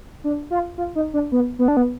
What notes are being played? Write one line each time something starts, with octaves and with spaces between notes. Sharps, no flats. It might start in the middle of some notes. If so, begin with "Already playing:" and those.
D4
F4
F4
D#4
D4
B3
B3
D4
B3